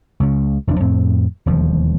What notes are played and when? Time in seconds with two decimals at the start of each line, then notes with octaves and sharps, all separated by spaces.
0.20 C#2 C#3
0.67 F1 E2 F3 D4
0.80 F2 A2 C4
1.46 E1 D#2 F3